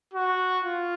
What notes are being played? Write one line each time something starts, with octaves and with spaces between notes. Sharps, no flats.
F#4
F4